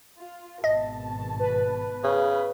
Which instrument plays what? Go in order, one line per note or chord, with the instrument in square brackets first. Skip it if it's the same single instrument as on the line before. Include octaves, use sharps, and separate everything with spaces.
[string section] F4
[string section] G#1 B2 A5 [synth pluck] D#5
[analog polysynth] B4
[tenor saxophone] C#3